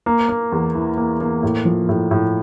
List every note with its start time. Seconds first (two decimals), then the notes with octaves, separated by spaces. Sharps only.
0.06 A#3
0.29 A#3
0.52 E2
0.75 E3
0.97 A#3
1.21 A#3
1.43 A2
1.65 F3
1.89 A2
2.11 A2